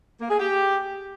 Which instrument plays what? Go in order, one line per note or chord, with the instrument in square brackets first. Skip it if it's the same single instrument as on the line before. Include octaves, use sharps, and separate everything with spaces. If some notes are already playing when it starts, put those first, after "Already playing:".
[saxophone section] A#3
G#4
G4